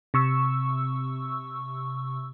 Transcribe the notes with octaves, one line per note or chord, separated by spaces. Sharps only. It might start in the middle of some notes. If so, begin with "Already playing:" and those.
C3 C#6 E6